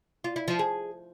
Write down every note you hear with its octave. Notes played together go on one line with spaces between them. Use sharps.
F4
E4
F3
G#4